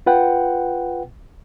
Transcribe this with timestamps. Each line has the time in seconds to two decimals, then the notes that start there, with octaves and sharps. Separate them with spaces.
0.06 F4 B4 F#5 G5